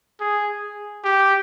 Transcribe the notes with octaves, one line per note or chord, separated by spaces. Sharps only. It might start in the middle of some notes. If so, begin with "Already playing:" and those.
G#4
G4